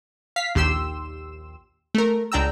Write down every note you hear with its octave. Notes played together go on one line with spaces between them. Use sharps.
F5 B6 C7
A#1 D#2 G4 C6 E6 E7
A3 A#4
C#2 D4 G5 A#5 E6